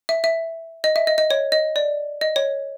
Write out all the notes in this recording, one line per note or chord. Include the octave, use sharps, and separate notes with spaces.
E5
E5
D#5
E5
D#5
D#5
C#5
D#5
D5
D#5
C#5